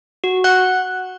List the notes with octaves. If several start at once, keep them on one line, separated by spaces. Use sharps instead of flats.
F#4
F#5 F#6